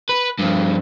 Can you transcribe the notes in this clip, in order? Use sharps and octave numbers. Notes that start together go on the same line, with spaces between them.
B4
G2 F3